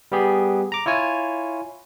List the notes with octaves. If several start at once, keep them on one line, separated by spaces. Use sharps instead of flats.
G3 B3 G4 G#4
A#5 D6
E4 F4 C#5 G#5